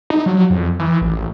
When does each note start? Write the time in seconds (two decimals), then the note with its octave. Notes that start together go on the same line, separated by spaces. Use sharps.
0.10 D#4
0.26 F#3
0.50 F2
0.79 E3
1.01 A1